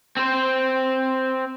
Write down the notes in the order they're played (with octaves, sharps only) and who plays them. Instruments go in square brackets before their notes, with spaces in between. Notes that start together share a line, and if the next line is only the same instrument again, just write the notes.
[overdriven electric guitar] C4 C5